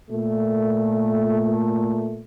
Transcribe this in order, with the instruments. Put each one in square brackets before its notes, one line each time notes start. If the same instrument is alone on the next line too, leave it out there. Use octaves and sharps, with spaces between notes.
[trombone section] A#2 A3